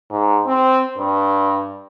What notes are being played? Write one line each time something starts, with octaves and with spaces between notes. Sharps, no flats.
G#2
C4
G2